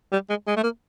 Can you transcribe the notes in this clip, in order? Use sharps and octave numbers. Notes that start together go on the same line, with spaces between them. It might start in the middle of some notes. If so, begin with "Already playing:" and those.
G3
G#3
G#3
A3
A#3